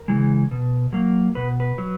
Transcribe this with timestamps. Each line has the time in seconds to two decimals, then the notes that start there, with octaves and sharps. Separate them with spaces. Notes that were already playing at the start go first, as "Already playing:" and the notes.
Already playing: A#4
0.08 C#3 E3 G#3
0.51 B2
0.93 F#3 A#3
1.35 B2 B4
1.60 B4
1.78 F#3